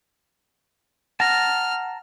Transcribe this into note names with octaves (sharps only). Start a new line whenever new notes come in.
F#5 A5 A#5 F6